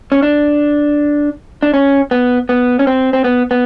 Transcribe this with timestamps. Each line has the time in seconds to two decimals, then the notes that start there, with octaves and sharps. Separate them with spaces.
0.12 C#4
0.22 D4
1.63 D4
1.74 C#4
2.11 B3
2.49 B3
2.79 C#4
2.87 C4
3.13 C4
3.24 B3
3.51 B3